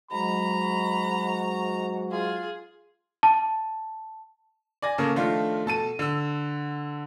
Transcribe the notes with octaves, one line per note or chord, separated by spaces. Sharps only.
G#2 F#3 G#3 F#4 D#5 A#5 B5
F4 G#4
A5
D5 G#5 A#6
C#3 A#3 C#4 A4
D#3 F3 A3 D4 F4
B2 A4 A5 D#7
D3 E6